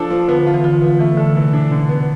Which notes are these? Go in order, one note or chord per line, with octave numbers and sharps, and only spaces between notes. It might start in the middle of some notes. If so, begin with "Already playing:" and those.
Already playing: F3 D4 A4
F3
D3 B3
F4
E3
D3 F4
B3
E3 A3
D3 A4
C3 E3
B2 D4
D3
B3